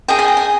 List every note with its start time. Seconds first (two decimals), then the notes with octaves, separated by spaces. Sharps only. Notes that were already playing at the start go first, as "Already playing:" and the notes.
0.08 G#4 D#5 G5
0.19 G#5
0.28 G5
0.37 G#5